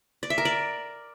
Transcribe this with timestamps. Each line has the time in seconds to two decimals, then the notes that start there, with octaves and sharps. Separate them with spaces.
0.23 D5
0.30 E5
0.38 A#4
0.45 D5